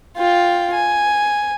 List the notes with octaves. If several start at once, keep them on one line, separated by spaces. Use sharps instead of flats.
F4 G5
G#5